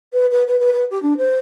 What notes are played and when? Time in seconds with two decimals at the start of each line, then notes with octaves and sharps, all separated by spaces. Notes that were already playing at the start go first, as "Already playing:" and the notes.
0.13 B4
0.31 B4
0.47 B4
0.60 B4
0.73 B4
0.90 G4
1.03 D4
1.17 C5